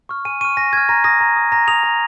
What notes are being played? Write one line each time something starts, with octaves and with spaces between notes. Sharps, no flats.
C#6 F6
G#5 D#7
C#6 F6 D#7
G#5 A#6
C#6 F6 G#6
A#5 A#6
D#6 A#6
A#5
D#6
A#5 A#6
D#6 F7
A#5